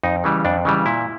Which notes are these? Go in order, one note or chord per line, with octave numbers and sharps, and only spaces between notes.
F2 D#4
C#3 E3 G3
F2 D4
C#3 E3 G3
A#2 E4